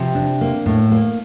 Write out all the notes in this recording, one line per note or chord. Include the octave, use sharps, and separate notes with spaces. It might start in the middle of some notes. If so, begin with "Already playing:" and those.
Already playing: C3 F3
D4
A#3
A2
A#3